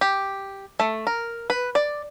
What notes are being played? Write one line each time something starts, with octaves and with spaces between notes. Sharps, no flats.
G4
A3
A#4
B4
D5